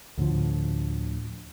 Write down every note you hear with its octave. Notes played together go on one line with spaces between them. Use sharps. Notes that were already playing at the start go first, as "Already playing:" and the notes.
D2 A2 D3 F3